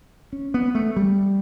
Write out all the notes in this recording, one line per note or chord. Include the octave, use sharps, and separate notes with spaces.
C#4
B3
A3
G3